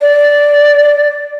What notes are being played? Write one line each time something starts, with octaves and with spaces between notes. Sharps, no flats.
D5